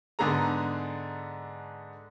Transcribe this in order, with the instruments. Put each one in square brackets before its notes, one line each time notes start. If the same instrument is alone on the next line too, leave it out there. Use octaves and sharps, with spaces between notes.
[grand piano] G#2 D3 B3 G#4 A4 A#5